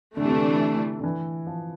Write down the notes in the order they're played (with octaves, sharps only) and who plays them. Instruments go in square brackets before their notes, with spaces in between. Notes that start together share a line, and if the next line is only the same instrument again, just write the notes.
[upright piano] D3 [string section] E3 A3 D4
[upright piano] C3
D3
D3
E3
F3